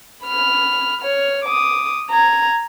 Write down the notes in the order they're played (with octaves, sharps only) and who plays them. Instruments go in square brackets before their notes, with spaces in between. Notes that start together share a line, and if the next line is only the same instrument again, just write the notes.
[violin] B5 F6
C#5 F6
D6 D#6
A#5 G#6